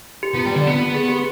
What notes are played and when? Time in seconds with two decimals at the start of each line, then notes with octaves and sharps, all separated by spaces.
0.23 G4
0.34 B3 F4
0.46 G3
0.56 D3
0.67 B3
0.94 G#4
1.08 G4